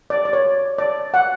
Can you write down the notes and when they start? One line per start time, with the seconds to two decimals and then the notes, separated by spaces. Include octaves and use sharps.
0.10 D5
0.25 D5
0.33 C#5
0.78 D5
1.14 F#5